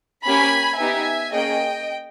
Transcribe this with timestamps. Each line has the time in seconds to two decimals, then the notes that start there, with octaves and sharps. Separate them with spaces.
0.24 A#3 C#4 G4 G#5 B5
0.78 B3 D#4 G4 E5 G#5
1.31 A#3 C#4 G#4 D#5 G5